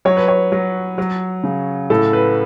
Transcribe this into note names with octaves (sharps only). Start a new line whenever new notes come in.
F#3 C#5
B4
C#5
F#3
F#3
C#3
A2 A4
B4